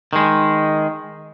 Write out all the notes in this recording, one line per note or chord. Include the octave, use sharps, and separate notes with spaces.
D#3 G#3